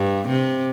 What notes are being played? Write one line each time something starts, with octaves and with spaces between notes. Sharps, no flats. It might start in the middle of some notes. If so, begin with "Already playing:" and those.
Already playing: G2
C3